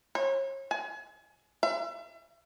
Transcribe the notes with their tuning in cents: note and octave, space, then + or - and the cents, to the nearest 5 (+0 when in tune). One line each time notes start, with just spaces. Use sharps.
C#5 -35
G#5 +35
E5 +40